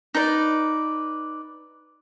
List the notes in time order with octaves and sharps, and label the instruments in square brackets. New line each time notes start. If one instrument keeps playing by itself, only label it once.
[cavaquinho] D#4 B4 D5